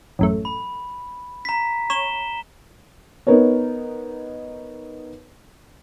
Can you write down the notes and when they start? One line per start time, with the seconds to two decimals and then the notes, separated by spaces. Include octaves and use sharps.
0.19 A1 F#2 A3
0.45 B5
1.45 A#5 B6
1.90 C#5 E7 G7
3.27 B3 D#4 A#4 B4 C#5